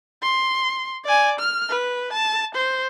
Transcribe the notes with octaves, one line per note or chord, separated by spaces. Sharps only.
C6
D5 G#5
F6
B4
A5
C5